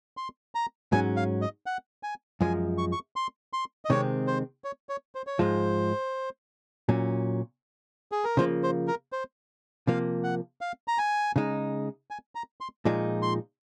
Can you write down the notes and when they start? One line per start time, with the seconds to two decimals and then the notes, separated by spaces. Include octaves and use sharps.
0.17 C6
0.55 A#5
0.92 G#2 F#3 C#4 G#5
1.16 F5
1.41 D#5
1.66 F#5
2.03 G#5
2.41 F#2 F3 G#3 G#5
2.78 C#6
2.92 C#6
3.16 C6
3.53 C6
3.85 D#5
3.90 C3 D#3 G#3 C4 C#5
4.27 C5
4.64 C#5
4.89 C#5
5.15 C5
5.27 C#5
5.39 G#2 F3 G#3 C5
6.89 A#2 F#3 C#4
8.12 G#4
8.24 A#4
8.37 C#3 F3 A#3 C5
8.63 C5
8.87 A#4
9.12 C5
9.87 C3 F3 A#3 F5
10.24 F#5
10.61 F5
10.88 A#5
10.98 G#5
11.36 C#3 G#3 D#4
12.11 G#5
12.35 A#5
12.61 C6
12.85 A#2 F3 G#3 D#4
13.22 C6